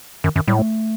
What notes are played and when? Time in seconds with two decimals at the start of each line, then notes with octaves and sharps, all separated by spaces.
0.24 F#2 D#3
0.36 F#2 D#3
0.48 A2 G3
0.59 A3